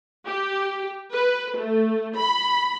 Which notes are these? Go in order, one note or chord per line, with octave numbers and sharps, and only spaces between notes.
G4
B4
A3
B5